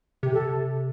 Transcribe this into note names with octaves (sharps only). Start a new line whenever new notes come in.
C3 G4
A4